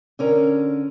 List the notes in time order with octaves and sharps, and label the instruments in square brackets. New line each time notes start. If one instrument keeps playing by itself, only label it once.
[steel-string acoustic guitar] D3 C#4 A#4